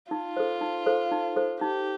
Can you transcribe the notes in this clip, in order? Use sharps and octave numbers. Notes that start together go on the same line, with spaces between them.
D#4 F4
A4 C5
D#4
A4 C5
D#4
A4 C5
D#4 G4